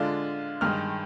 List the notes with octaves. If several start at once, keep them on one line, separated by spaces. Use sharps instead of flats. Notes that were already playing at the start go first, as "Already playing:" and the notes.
Already playing: D3 G#3 D4 F4
G2 D#3 G#3 F6